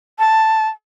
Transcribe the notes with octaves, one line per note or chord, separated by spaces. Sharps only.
A5